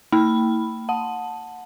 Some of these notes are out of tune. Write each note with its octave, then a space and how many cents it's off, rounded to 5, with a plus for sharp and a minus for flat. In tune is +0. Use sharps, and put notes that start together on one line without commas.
A#3 -40 B5 +0
F#5 -20 A5 +0